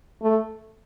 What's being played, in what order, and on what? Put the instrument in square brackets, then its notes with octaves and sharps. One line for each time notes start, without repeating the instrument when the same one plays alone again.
[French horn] A3